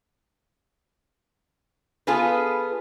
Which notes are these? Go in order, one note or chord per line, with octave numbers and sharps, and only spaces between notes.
B3 F4 G#4 A4 B4